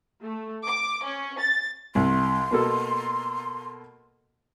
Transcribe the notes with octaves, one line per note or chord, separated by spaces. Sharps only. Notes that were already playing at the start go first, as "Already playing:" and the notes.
A3
D6
C#4
A6
C2 C6
B2 A#3 A4